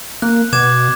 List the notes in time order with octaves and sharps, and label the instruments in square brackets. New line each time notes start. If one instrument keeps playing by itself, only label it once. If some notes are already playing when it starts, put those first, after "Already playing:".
[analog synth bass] A#3 [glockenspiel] F#6
[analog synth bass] B2 [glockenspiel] D6 G#6 E7